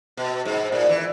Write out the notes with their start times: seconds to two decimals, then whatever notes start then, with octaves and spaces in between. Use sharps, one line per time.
0.17 B2
0.45 G#2
0.72 A#2
0.89 E3